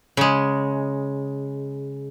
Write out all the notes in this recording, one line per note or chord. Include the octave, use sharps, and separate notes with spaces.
C#3 G#3